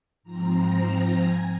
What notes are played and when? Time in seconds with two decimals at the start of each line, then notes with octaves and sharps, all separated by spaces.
0.23 G#2 F3 C4 A#5
1.12 G#5